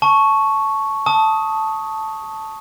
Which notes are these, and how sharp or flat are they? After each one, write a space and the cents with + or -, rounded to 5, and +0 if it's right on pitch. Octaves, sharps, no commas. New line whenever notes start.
A5 -5 C#6 +0
A5 +0 D#6 +15